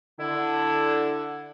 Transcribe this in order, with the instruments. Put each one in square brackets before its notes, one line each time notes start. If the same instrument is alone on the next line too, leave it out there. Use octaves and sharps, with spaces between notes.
[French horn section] D3 [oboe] E4